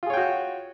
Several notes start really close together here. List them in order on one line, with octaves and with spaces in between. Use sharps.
F4 G#4 C#5 G5 F#4